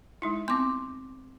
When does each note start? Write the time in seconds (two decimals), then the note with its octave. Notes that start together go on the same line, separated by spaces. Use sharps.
0.22 G#3 D#4 E4
0.48 B3 C4 C6 D6